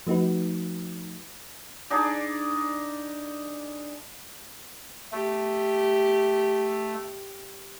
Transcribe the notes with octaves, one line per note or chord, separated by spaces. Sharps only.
F3 A3 D#4 F#4 B4
D4 D#4 G#4 D5
A3 G4